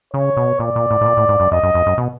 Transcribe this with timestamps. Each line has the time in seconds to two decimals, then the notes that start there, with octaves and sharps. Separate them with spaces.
0.14 C#3 C#5
0.37 B2
0.59 A#2 D5
0.76 A#2
0.91 A2
1.01 A2
1.06 A#2
1.17 A2
1.29 G#2
1.40 F#2
1.52 F2 D#5
1.63 F#2
1.74 F2
1.86 F#2
1.98 B2